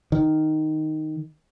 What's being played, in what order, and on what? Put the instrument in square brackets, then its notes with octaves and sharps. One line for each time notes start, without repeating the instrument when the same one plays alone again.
[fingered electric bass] D#3